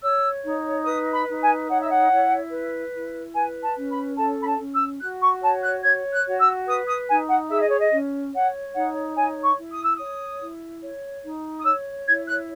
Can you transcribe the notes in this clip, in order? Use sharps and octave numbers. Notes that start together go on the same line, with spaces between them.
C#5 E6
D#4
B4 D#6
B5
D#4
G#5
C#5 F#5
E5
F#5
E4
B4
E4
B4 G#5
A5
C#4
B5
A4 A5
B5
A5
C#4
E6
F#4 F#6
C#6
C#5 A5
F#6
C#5 G#6
F#6
F#4
E6
B4 D#6
D#6
D#4 G#5
F#5
G#4 E5
D#5
C#5
D#5
C#4
C#5 F#5
D#4 F#5
C#5 G#5
C#6
E4
D#6
E6
C#5 D#6
E4
C#5
D#4
D#6
C#5 E6
E4 G#6
F#6